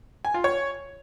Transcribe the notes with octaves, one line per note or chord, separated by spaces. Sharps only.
G#5
F4
C#5